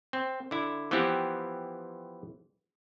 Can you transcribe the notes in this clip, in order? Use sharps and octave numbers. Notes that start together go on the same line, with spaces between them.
C4
D3 E4
E3 F3 B3 C4 E4 G4